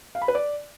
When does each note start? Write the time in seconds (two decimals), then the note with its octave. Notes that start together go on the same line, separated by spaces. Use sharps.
0.15 F5
0.22 B5
0.28 B4
0.35 D5